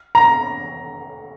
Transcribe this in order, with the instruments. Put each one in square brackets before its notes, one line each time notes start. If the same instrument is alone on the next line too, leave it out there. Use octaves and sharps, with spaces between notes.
[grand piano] A#5